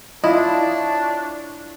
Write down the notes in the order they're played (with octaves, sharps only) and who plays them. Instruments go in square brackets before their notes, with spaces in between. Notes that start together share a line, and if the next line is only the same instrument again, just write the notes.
[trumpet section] D4 C#5 A5 [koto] E4 [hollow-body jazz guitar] F4 [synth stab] D#5